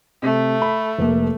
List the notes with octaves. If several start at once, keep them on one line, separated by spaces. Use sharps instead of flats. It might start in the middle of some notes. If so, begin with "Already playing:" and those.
C3 A3
B5
F1 A#3